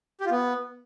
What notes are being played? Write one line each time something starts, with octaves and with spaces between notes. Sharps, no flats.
G4
F4
B3